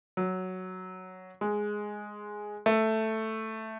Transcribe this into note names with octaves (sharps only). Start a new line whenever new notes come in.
F#3
G#3
A3